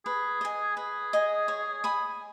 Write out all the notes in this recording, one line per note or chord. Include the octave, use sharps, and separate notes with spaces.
G#4 B4
D#5 G#5
G#4 B4
D#5 G#5
C#5
G#5 B5 D#6